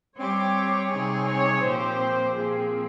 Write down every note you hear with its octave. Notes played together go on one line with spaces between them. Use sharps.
G3 C4 G4 C#5
C3 G3 C4 D#4 G#4
C#5
A#2 F3 C4 G4 C5
A#2 F3 C4 G#4